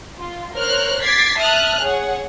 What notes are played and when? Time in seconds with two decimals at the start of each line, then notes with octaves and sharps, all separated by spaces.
0.18 F4
0.55 A#4 C5 C#5 F6 F#6
1.02 D6 G#6 A6 B6 C7
1.38 E5 A5 D#6 F6 F#6
1.81 G#4 C#5 F#5